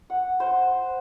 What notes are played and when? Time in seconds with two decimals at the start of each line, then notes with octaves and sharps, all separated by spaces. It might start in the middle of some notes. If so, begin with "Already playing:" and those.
0.10 F#5
0.40 C5